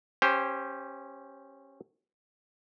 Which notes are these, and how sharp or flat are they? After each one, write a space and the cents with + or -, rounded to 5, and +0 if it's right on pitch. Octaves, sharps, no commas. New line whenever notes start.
C#4 -15 G4 +0 C5 +0